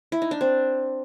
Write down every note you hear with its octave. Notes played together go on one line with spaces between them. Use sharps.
E4
D#4
D4
C4